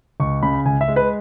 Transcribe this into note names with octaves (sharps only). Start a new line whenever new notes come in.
C#2 C#6
C#3 B5
C#2 G#5
E5
G#3
B4